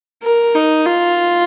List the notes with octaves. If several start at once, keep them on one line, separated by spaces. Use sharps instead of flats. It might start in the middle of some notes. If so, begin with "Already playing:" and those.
A#4
D#4
F4